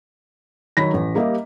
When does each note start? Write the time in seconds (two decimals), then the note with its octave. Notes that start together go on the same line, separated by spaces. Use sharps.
0.77 D#3 F#3 C#5 B5 A#6 B6
0.94 A1
1.15 G3 A#3 G4 D#5 E5